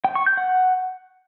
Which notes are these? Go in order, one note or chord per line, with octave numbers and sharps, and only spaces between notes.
G5
C#6
G6
F#5